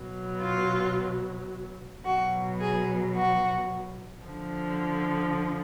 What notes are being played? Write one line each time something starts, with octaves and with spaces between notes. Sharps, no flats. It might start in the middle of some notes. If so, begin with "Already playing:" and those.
Already playing: B2 F#3
F4
B2 F#3 F#4
G#4
F#4
D3 F3